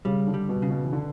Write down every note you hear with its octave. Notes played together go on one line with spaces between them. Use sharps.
C#3 G3
D3
G3
B2
C#3
B2
E3
D3